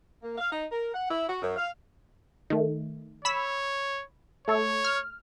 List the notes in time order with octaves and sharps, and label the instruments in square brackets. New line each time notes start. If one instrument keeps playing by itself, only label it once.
[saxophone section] A#3
F5
D#4
A#4
F#5
E4
F#4
F#2
F5
[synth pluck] D#3 A3
[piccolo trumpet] C#5 [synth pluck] B5 E6 B6
[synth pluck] A3 A4 [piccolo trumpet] C#5
[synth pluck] F6